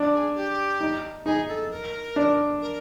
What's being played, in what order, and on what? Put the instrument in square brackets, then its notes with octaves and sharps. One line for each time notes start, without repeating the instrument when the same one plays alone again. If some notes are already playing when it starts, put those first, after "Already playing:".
Already playing: [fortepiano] D4
[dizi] G#4
G4
[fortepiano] D#4
[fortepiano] D#4 [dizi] G#4
[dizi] A4
A#4
[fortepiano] D4
[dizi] A#4